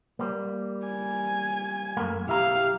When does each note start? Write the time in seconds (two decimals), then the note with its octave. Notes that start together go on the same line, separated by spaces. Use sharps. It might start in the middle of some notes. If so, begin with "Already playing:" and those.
0.19 G3 A#3
0.86 G#5
1.97 F#2 A3 A#3
2.27 B1 E4 G4 F5 A#5